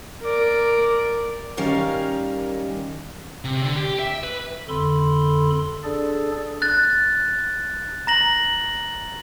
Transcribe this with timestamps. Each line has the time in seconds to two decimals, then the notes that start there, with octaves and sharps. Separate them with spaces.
0.22 A#4 D5
1.57 D#3 G3 C#4 A#4 F5
3.45 C3
3.62 D3
3.76 G4
3.99 E5
4.24 B4
4.68 F2 D3 A4 B5 C6
5.84 D4 G#4 A4 D5
6.62 F#6 A6
8.07 A#5 A#6 F#7